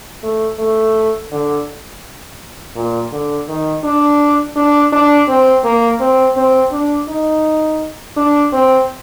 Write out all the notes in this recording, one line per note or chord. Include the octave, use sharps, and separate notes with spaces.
A3
A3
D3
A#2
D3
D#3
D4
D4
D4
C4
A#3
C4
C4
D4
D#4
D4
C4